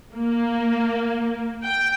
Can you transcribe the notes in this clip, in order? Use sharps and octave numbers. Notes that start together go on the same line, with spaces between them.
A#3
G5